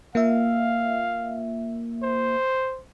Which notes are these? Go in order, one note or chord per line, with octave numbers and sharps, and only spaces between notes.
A#3 F4 E5 F5
C5